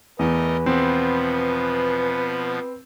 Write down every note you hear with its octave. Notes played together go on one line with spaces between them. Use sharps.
E2 A3 A#4 B4 D#5
B2 F3 B3 C4